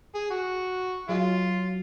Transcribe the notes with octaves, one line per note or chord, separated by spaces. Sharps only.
G#4
F#4
F#3 G#3 F4